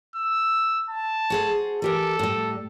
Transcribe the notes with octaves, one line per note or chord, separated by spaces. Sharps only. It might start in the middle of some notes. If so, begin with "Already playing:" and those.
E6
A5
F#4 G#4 C5
E3 G4 A4 A#4
A2 G3